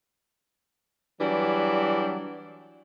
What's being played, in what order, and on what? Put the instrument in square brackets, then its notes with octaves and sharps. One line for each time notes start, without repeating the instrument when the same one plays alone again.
[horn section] E3 F#3 G3 D4 G4